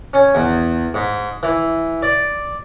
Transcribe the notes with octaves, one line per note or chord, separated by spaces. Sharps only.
C#4
E2
G#2
E3
D5